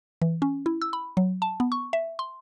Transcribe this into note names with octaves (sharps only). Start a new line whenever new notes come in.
E3
C#4
E4
E6
B5
F#3
A5
B3
C#6
E5
C6